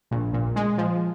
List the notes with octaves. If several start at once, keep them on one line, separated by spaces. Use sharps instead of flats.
A#1
A#2
G#3
F3